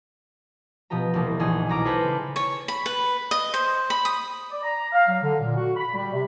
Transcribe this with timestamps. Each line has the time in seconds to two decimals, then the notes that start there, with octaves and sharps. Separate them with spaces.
0.90 B2 F3 B3 G4 A#5
1.14 E1 C2 A#3
1.39 A#1 E3 D#4 G#4
1.69 B1 A#5 D6 F6
1.85 G#4 A4 B4 C5 B5 G6
2.03 C#3
2.36 C#5
2.68 B5
2.86 B4
3.31 D#5
3.54 C5
3.90 B5
4.05 D#6
4.51 D5
4.63 A#5
4.92 F5
5.07 F#3
5.22 D3
5.39 A#2
5.56 F#4
5.77 B5
5.94 G3
6.12 C3